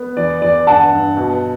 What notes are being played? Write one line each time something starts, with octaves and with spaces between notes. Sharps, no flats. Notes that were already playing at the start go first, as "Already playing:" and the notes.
Already playing: B3
E2 D5
E2 D5
G2 F#5 A5
G2
B2